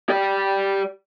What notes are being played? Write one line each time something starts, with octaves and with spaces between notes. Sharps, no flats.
G4 D5